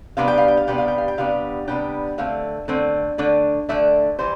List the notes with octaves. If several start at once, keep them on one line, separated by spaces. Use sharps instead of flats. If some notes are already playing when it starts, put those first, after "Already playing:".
C3 G3 B3 D4 F5
G5
F5
G5
F5
C3 G3 B3 D4 G5
F5
G5
F5
G5
C3 G3 B3 D4 F5
C3 G3 B3 D4 G5
D3 A3 C4 F5
D3 A3 C4
D3 A3 D4
D3 A3 D4 E5
E3 G3 C5